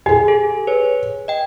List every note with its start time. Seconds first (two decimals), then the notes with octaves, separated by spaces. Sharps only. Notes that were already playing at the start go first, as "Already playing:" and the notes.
0.06 G4 G#4 G#5
0.28 A4
0.67 B4 C#5
1.28 D#5 G5